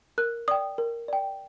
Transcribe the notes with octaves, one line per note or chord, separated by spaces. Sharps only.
A#4 F#6
D5 G5 D#6
A#4
D5 G5